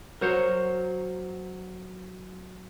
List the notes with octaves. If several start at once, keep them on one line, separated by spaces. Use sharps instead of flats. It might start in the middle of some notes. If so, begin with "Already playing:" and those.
F#3 A#4 C5 C#5